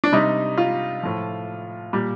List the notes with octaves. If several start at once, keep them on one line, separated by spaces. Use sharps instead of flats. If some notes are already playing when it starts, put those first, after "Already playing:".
D4
C3 G3 D#4
F4
A2 F3
A#2 G3